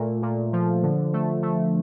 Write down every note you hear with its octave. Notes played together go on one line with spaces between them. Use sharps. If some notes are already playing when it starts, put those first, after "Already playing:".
Already playing: A#2 A3
A#2
F3
D3
A3
A3